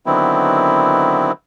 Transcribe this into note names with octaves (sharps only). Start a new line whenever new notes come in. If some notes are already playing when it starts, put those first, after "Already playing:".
D3 D#3 F#3 B3 C4 E4